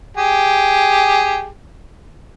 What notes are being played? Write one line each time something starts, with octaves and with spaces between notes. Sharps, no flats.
G4 G#4